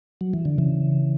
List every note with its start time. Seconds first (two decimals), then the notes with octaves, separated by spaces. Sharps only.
0.21 F#3
0.34 E3
0.45 D3
0.58 C#3 E3